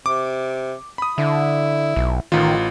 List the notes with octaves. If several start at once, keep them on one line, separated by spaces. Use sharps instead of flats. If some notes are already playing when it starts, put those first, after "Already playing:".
C3 D6
B5 D#6
D3 E4
B1
A1 D#3 F4